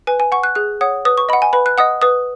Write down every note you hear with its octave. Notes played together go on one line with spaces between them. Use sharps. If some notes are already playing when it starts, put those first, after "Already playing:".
B4 G#5
G#5
F#5 C#6
F#6
G#4 F#6
C#5 F#5 D#6
B4 D#6
C#6
D#5 F#5 B5
G#5
B4 B5
F#6
D#5 F#5 D#6
B4 D#6